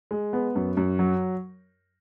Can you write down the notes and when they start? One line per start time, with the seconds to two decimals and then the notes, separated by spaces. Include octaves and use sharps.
0.11 G#3
0.33 B3
0.56 F#2
0.77 F#2
0.99 F#3